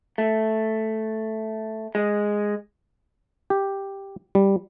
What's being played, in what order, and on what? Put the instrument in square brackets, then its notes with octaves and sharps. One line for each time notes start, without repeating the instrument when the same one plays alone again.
[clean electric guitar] A3
G#3
[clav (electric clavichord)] G4
G3